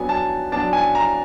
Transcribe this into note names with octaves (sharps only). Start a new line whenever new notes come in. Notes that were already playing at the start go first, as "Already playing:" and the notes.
Already playing: F#3 B3 D4 G#5
A5
F#3 B3 D4 A5
G#5
A#5